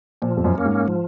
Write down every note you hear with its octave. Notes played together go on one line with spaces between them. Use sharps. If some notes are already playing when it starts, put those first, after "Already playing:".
A#2 F3
F2
F#2
A#3 C#4
G#2
F3